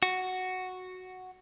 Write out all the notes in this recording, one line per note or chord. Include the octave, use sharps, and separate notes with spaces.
F#4